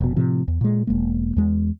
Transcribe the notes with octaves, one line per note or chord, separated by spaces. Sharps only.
F1 B2
A2 C3 F3
E2
A#2 G#3
E1 G#3 A#3
E2 G#3